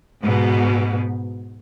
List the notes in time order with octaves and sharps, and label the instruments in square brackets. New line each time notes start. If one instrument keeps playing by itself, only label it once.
[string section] G#2 B2